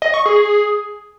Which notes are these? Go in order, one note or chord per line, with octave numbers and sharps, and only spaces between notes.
D#5
C#6
G#4